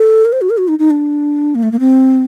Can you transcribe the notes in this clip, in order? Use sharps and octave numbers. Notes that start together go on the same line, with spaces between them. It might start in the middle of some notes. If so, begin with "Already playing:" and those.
Already playing: A4
A#4
C5
F#4
A#4
F#4
D#4
D#4
D4
A#3
A3
A#3
C4